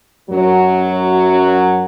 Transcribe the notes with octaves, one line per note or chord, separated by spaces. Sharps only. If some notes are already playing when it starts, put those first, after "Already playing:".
F#2 F#3